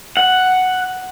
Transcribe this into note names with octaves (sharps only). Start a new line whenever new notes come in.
F#5